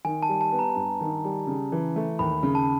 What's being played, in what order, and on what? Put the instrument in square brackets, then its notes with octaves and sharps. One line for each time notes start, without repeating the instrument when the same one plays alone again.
[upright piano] D#3 [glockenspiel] G#5
[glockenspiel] A5
[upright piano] G3
[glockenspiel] A5
[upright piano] B3
[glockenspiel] A#5
[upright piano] G2
D#3
G3
C#3
E3
A3
[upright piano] D#2 [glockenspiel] B5
[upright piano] C#3
[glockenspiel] A5